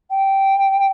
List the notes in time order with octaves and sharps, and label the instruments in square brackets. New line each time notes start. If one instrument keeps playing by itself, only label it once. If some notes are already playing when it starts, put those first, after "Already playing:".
[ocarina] G5